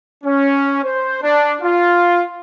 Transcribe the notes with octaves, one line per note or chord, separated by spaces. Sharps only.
C#4
C5
D4
F4